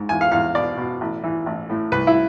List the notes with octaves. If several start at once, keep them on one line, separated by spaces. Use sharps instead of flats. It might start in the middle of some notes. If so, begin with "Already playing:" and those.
Already playing: G#2
E2 G#5
F5
E2 F5
B2 D5
B2
A1
E3
A1
A2
C2 B4
E4